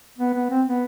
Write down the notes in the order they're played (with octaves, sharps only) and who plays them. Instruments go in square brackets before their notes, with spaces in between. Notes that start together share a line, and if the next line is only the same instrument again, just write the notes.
[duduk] B3
B3
C4
B3